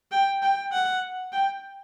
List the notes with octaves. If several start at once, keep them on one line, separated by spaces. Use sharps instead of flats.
G5
G5
F#5
G5